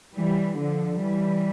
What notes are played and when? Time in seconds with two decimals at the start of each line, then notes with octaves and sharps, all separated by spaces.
0.16 E3 G3
0.60 D3 F3
1.03 E3 G3